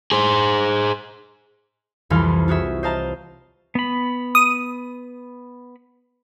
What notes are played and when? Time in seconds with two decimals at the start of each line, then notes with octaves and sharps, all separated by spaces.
0.12 G#4 C5
2.10 C2 F2 E3 F5 C6 F6
2.48 F4 F#4 G#4 E5
2.83 C5 D#5 F5 A5 A#5
3.75 B3 B5
4.35 D#6